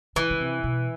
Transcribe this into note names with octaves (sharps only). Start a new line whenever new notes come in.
C#3 E3
C#3
C3
B2